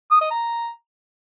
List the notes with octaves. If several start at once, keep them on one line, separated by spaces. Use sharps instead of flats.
D#6
D#5
A#5